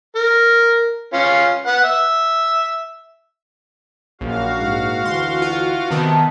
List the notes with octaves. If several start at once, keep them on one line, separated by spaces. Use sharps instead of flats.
A#4
C#4 F4
B4 F#5
E5
A#1 F#2 F#4 F5
G#2 A#3 D#4
D2 E3 C6
F4
C3 D#3 B3 A5